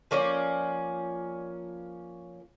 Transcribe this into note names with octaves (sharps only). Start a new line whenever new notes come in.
F3 A#3 C#4 D5